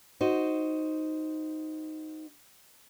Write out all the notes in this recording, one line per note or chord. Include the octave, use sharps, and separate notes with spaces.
D#4 F#4 C5